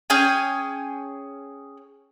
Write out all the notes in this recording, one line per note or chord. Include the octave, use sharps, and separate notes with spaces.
C#4 G#4 G5 G#5